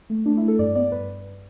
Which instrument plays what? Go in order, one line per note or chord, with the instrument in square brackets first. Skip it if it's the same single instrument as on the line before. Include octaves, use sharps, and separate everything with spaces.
[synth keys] A3
A3 D4
A3 E4
A4
G2 D5
B3 D5
G2 B4